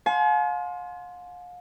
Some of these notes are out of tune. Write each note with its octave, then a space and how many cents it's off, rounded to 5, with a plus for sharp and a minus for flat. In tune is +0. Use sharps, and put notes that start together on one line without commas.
F5 +40 G#5 +45 C6 +0